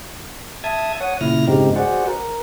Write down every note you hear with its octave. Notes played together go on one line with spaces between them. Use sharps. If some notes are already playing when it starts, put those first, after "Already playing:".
E5 A5 D#6 G#6
C#5 F#5 D#6
A#2 C#3 E4 F6 A#6
G#2 C#3 G#3 C4 D#4 G4
F#4 G#4 C5 D5 F#5
A#4